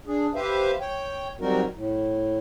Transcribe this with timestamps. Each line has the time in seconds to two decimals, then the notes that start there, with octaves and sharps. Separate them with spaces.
0.07 D4 G#4
0.35 G4 B4 C5 E5 F5
0.80 C#5 G5
1.40 F#3 G3 C4 D#4 F#4 A#4
1.74 A2